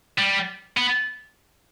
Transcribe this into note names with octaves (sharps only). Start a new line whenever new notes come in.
G3
B3